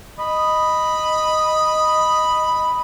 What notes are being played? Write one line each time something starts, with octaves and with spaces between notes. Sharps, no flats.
D#5 B5